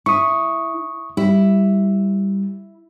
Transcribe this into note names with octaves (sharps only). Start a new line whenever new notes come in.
E4 C#6 D#6
G3 E4